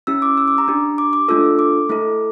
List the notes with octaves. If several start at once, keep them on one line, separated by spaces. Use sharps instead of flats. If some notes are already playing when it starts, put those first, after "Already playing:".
C#4 E4 G4 E6
D6
E6
D6
A#5
D4 G4
D6
D6
A3 D4 F4 A4 E6
D6
A3 E4 A4